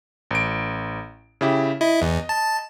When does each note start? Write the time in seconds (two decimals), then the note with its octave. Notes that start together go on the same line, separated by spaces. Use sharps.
0.31 A1 D7
1.41 C#3 E4 G4
1.81 E4 D#5
2.02 E2
2.29 A5